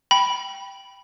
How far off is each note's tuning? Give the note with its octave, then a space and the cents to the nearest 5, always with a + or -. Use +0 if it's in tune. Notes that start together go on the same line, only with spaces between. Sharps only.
G5 +0 B5 +0